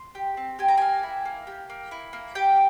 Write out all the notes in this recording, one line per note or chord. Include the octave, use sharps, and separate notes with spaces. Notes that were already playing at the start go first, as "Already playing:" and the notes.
Already playing: C6
G4
C4
G4 G#5
A#5
A#3 G#5
E4
A#3
G4
A#3
E4
A#3
G4 G5